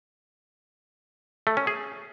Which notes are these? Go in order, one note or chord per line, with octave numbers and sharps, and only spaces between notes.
A3
C#4
G#4